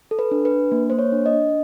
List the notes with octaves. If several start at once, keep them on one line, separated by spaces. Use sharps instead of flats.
A4
B4
D4
B4
D4
A#3
A#3 C5
C#5
D4
D#5
D4